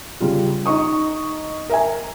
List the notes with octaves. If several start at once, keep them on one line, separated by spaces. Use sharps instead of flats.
C#3 G3 F4
D#4 D#5 C#6 D#6
A#4 E5 G#5